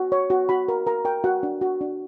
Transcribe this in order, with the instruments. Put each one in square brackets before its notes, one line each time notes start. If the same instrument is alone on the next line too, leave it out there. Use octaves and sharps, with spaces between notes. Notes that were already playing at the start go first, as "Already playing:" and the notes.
Already playing: [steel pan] F#4
C#5
F#4
F#4 B5
A#4
A#4 A#5
A#4 G5
F#4 F#5
D4
F#4
D4